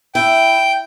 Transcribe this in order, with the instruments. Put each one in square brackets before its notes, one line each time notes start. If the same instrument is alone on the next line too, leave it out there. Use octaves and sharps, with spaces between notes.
[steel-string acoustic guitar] E4 [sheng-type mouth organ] G5